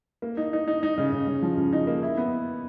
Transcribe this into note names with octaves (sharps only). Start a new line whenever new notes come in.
A#3
D#4
D#4
D#4
D#4
C#3
C#3
C#3
F3
C#3
D#4
A#3
E4
B3